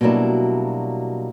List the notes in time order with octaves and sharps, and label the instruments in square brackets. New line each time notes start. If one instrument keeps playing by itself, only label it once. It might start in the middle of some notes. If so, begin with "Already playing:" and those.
[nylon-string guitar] B2 F#3 G3 A#3 D4 E4